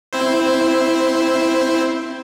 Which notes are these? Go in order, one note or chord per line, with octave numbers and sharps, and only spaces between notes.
C4 E4 C5